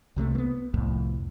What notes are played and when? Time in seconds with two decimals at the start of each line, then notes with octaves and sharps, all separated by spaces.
0.16 C2 C3 F#3 A3
0.35 A#3 B3
0.74 C2 F2 A2